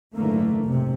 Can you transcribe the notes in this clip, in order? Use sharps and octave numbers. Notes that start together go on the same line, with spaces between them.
F#1 G#2 D3 E3 A3 A#3
F1 B1 G#2 C3